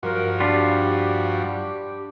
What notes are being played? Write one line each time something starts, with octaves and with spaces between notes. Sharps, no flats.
G2 F3 F#4 A#4
G3 D4 F4 G4